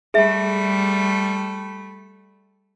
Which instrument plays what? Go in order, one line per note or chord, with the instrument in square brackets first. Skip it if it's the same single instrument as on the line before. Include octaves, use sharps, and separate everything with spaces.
[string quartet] G3 A3 B5 [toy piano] G#4 E5